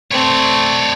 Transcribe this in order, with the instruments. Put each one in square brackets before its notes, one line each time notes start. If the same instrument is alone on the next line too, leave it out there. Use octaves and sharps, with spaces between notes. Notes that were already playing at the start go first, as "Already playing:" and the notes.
[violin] A3 C4 [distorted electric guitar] C#5 D5